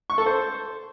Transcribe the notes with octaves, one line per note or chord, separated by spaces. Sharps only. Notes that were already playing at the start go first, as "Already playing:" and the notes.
C#6
A4
C5